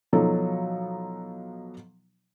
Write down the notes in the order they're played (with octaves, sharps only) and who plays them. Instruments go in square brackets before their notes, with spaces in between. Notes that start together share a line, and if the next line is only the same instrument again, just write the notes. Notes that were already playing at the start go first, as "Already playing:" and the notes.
[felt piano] B2 F3 F#3 D#4 A4